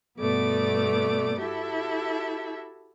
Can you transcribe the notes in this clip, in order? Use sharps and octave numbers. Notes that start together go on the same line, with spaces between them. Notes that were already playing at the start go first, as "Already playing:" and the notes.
G2 B2 A3 B3 D5 D6
E4 F#4 G4 A4 E5